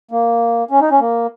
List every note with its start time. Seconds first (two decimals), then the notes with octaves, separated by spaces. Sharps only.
0.11 A#3
0.71 C#4
0.81 D#4
0.91 C#4
1.00 A#3